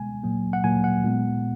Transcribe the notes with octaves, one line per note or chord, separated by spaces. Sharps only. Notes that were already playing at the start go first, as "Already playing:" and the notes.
Already playing: B2 G#3 B3 G#5
A#2 F#3 A#3
F#5
A#2 F#3 A#3 G#5
F#5
A#2 G#3 B3